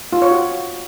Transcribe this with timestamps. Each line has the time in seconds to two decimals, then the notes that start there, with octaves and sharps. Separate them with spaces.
0.13 F4
0.22 C#5
0.31 F#4